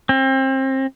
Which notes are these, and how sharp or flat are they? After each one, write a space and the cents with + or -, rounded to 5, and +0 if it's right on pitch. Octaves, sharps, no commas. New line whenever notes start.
C4 +30